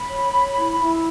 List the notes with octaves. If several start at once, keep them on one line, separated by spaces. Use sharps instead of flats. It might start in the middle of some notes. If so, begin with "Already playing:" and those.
Already playing: B5
C#5
C#5
E4
E4